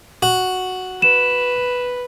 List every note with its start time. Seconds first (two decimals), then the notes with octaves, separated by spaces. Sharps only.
0.22 F#4
1.02 B4 E7